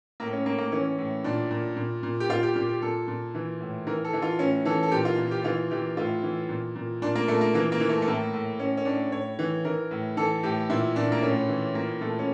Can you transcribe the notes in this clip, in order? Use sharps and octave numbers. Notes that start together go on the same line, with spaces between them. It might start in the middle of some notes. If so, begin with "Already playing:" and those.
A2 A#3
C#4
A2 A#3
A#3
E3 C#4
A2
A#2 D4
A#2
A#2
A#2
G4
A#2 F4
G4
A#2 G4
G4
A#2 A4
A#2
E3
A2
E3 A#4
A4
E3
F4
A2 C#4
E3 A4
A4
A#2 G4
F4
A#2
G4
E3 F4
E3 G4
A2 F4
E3
A#2
A#2
A#2 D4
A#3
A#2 A3
A#3
E3 A#3
A#3
E3
A3
A3
A2 A#3
A2
A2 C#4
C#4
A2 D4
A2 C#5
E3
E3 A#4
A2
E3 A4
A2 G4
A#2 E4
A#2 D4
A#3
A2 C#4
E3
A#2 A#3
A#2 A3
C#4